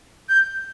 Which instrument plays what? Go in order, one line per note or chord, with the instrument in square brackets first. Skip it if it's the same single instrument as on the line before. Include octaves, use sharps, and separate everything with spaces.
[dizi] G6